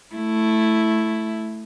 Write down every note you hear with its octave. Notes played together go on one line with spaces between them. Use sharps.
A3 E4